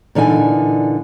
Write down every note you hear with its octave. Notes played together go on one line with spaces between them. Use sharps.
A#2 D3 E3 D#4 G#5